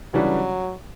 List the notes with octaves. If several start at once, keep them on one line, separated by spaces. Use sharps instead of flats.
C#3 E3 F#3 G3 D4